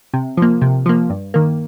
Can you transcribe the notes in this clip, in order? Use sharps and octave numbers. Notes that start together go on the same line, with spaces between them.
C3
F3 A#3
C3
F3 A#3
G2
D#3 A#3